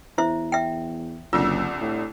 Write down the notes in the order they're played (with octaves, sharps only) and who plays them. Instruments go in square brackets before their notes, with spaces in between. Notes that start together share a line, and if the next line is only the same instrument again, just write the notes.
[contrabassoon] E2 [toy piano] E4 C5 E5
[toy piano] E5 G5
[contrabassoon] F#1 [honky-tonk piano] C2 D3 E6 [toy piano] F4
[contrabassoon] A2